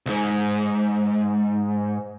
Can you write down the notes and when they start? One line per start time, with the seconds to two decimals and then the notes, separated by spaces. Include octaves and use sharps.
0.06 C2 G#2